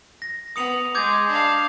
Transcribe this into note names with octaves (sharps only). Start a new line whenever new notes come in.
A#6
B3 D#6 C#7 F7
G#3 D6 G6 G#6
D4 F5